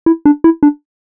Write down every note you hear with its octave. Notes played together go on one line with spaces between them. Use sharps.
E4
D4
E4
D4